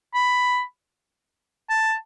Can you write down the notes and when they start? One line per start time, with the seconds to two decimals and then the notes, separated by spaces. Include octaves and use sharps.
0.15 B5
1.70 A5